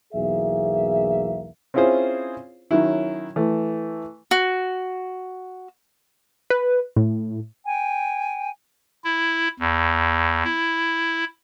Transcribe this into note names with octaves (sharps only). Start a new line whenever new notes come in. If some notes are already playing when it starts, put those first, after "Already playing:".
B1 E2 E3 A#3 G#4 E5
C4 C#4 E4 F4 G#4 C5
D#3 F#3 C#4 E4
E3 A3
F#4
B4
A2
G5 G#5
E4
E2
E4